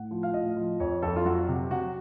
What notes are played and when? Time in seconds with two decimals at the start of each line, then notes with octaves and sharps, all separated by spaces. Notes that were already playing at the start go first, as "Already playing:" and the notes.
Already playing: A2 F#5
0.11 F3
0.23 F5
0.34 A2 D#5
0.57 F3
0.80 F2 C#5
1.02 F2 A4
1.16 F4
1.25 F#3 F#4
1.48 C3
1.71 F#3 F#4